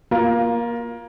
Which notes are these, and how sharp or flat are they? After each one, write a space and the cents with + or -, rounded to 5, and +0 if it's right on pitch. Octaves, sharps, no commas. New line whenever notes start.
A#3 +20 F4 +0